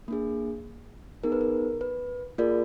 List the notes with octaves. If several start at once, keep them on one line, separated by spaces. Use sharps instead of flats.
A#3 D4 G#4
B3 D#4 G#4 A#4
B4
A#4
B4
A#3 F4 G#4 A#4 D5